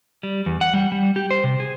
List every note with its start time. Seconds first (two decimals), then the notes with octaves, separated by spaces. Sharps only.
0.23 G3
0.46 E2
0.61 F#5
0.74 G3
0.92 G3
1.16 G4
1.31 C5
1.44 C3
1.60 G#4